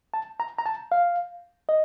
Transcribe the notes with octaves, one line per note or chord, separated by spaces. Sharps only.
A5
A#5
A#5
A5
F5
D#5